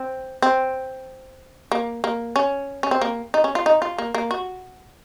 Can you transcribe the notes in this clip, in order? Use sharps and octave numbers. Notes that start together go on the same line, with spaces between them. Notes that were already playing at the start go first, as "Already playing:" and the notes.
Already playing: C4
C4
A#3
A#3
C#4
C#4
C4
A#3
D#4
C#4
F4
D#4
F4
A#3
A#3
F#4